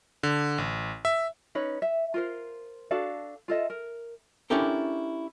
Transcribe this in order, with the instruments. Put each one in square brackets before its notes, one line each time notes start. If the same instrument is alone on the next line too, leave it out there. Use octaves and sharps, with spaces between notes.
[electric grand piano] D3
A1
E5
[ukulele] C#4 D#4 B4 C#5
E5
F4 A#4 C5
D4 F#4 A4 F5
F4 A4 D#5 E5
A#4
[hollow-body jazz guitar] C#4 D4 E4 G4 A4 A#4